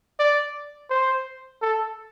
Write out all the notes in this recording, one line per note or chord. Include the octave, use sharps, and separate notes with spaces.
D5
C5
A4